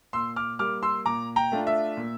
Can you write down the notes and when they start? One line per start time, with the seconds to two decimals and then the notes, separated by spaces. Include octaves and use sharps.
0.13 A#2 C6 E6
0.36 D6 F6
0.59 G3 A#3 D6 F6
0.83 C6 E6
1.06 A#2 A#5 D6
1.36 G5 A#5
1.52 A3 D4 F4
1.67 E5
1.97 A#2